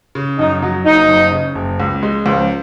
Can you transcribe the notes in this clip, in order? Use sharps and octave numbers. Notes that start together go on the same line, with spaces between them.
C#3
F#2 D#4
F#3
F#1 D#4
F#1
C#3
F#1
C#2
G#3
C#2 F3